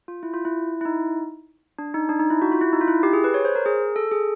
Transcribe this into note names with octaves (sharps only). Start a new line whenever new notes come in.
F4
E4
F4
E4
E4
D#4
D4
D#4
D4
D#4
E4
F#4
F4
E4
D#4
F4
E4
G4
G#4
B4
C#5
C5
A#4
G#4
A4
G#4